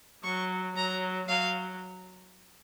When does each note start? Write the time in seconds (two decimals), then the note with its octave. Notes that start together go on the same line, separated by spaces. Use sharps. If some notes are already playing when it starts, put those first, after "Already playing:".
0.24 F#3 C#6
0.76 F#3 A#5
1.28 F#3 F5